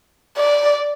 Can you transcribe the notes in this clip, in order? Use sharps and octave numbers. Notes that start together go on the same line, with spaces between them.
D5